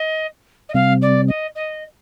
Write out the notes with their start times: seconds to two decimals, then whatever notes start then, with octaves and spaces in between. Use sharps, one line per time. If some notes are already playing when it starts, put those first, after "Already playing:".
Already playing: D#5
0.69 D#5
0.74 C3 G3 C4 F5
1.02 D5
1.28 D#5
1.55 D#5